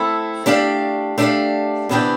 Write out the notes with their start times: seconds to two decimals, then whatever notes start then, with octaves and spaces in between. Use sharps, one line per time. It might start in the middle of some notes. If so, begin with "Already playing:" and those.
Already playing: A3 C4 E4 A4
0.46 A3 D4 G4 D5 F5
1.18 A3 D4 G4 D5 F5
1.89 C3 E3 B3 D4 G4